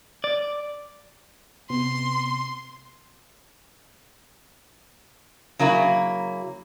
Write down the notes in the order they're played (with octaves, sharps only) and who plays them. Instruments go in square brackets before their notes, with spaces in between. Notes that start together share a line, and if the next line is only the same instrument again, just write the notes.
[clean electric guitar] D5
[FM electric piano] C3 B3 [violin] C6
[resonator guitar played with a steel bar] C#3 F#3 A#3 E4